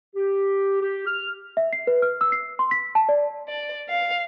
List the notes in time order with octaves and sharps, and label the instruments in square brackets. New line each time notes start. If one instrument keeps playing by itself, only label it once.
[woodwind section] G4
G4
F6
[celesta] E5
C7
B4
F6
E6
C7
C6
B6
A5
D5
[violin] D5
F5